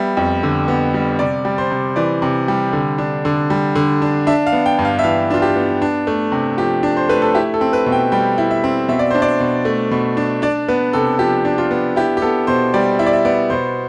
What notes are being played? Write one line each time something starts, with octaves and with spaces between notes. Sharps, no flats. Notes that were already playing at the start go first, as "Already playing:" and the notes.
Already playing: G3 B3 E5
F2
D3
B3
G3
C3 D5
G3
C5
C3
E3 D5
C3
G3
D3
D4
D3
G3
D3
D4
D4 E5
F5
B3
G5
G2
F5
E5
E3 F5
D4 F4
G4
B3
D4
A3
C3
F3 G4
D4
C5
A3 B4
A4
E4 G4
A4
C4
B4
B2
G5
G3 G5
E4
E5
C4
B2 E5
D5
D4 C5
D5
B2
A3
B2
D4
D4 D5
B3 B4
C3 A4
F3 G4
D4
F4
B3
E4 G4
G4
B3 A4
B2 C5
G3 D5
E4 E5
D5
E5
B3 D5
B2 C5